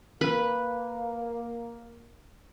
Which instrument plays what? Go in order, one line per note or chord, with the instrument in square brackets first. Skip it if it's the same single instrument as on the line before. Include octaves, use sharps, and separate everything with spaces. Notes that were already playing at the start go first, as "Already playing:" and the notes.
[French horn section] A#3 [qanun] B4